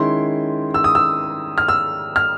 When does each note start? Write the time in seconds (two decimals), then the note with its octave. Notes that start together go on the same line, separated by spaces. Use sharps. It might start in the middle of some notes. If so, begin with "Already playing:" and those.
Already playing: D#3 G#3 C#4 E4 C6
0.74 E6
0.84 D#6
0.95 E6
1.58 F6
1.68 E6
2.16 F6